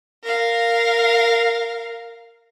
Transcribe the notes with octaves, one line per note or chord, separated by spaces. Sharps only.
A#4 F5